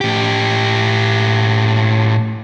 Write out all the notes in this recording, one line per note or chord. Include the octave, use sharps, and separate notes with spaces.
A2 G4